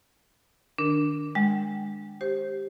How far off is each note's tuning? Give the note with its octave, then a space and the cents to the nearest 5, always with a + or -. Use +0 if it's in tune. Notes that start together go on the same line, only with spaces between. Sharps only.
D#3 -30 D4 +0 A#4 +0
G#3 -15 G5 -40
G4 +0 C5 +20